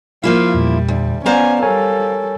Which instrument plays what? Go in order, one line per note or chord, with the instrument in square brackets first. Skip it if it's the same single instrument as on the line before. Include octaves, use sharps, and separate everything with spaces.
[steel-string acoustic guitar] F3 A#3 E4 [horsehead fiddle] F4 F5
[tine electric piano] E2 A#2 [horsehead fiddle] G3
[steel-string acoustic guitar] D2
[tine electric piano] B3 D5 [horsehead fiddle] C#4 G#5 [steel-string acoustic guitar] C5 F5 A#5
[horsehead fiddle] G3 A4 [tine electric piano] A#4 C#5 G#5